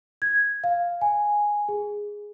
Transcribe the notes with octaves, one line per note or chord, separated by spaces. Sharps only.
G#6
F5
G#5
G#4